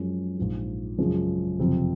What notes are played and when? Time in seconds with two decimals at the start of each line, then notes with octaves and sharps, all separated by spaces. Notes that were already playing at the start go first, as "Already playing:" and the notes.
Already playing: F#2 F3 G#3 C#4
0.38 A#1 G#2 F3
0.98 F#2 C#3 F3 G#3 C#4
1.59 F#1 F2 C3 F3 C4